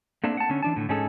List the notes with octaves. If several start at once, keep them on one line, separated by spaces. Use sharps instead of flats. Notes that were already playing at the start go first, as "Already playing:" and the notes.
A3 A#3 C4 D4
F#5 A5
D3 C#4
E3 D4 A5
A2 D3
G#2 C#4 D#4 G#4 A4